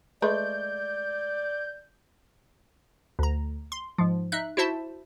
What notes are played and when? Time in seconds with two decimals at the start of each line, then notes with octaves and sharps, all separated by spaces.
0.22 G#3 A3 B4 D5 G6
3.19 D2 A#5
3.72 C6
3.98 G#2 F3
4.32 D#4 E5 F#6
4.57 E4 F#4 C5 E5 A5